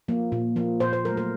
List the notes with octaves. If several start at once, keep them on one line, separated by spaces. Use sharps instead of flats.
F3 A#3
A#2
F3 A#3
A#2 C5
C5
F#3 A3 A#4
A#4